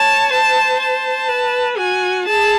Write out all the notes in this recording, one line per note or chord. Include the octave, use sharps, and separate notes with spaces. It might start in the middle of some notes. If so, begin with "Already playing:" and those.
Already playing: C#5 A5
C5 A5
A5
B4
F#4 G#5
G#4 A5